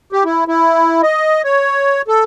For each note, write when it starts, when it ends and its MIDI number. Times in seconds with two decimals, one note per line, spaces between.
0.13 0.24 67
0.25 0.44 64
0.48 1.01 64
1.03 1.42 75
1.44 2.02 73
2.08 2.24 69